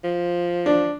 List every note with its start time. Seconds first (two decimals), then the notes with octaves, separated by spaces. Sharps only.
0.04 F3
0.66 D4